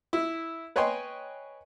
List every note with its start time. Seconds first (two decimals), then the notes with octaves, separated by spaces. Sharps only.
0.13 E4
0.76 B4 C#5 D#5 G5 G#5 C6